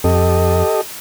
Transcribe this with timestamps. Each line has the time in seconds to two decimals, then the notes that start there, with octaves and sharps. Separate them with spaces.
0.04 F2 G4 A4 D#5